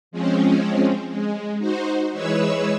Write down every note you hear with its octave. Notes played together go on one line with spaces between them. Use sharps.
F3 G#3 C4 C#4
G#3
D#4 F#4 C5
E3 G#3 G#4 B4 C#5 E6